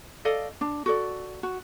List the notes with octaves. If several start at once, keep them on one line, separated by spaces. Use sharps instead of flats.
A4 D5 D#5 F5
D4
F#4 A4 D5
F#4